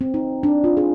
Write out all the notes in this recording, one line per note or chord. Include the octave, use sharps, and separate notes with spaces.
C4
D#4
D4
F4
G#4